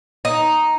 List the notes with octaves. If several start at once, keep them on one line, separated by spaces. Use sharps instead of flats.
D#4